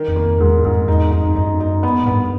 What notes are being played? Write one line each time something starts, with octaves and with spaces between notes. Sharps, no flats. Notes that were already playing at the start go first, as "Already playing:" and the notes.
Already playing: D#3
F2
A#3
F2
E2 G#2
F2 G#2
E2 D#4
F2 D#4
F2
F#2 D#4
D#4
B3
G#2
G2 B3